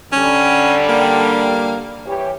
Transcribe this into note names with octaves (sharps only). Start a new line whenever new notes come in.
D3 G3 C#4
A#3
E3 G4 C#5